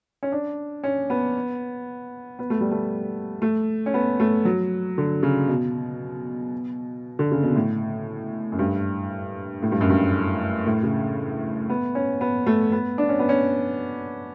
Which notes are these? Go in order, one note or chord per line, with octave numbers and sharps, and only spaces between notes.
C#4
D4
C#4
B3
B3
A3
G3
A3
A3
C#4
B3
A3
F#3
D3
C#3
B2
D3
C#3
B2
A2
F#2
G2
A2
G2
F#2
G2
A2
C#3
B3
C#4
B3
A3
B3
D4
C#4
B3
C#4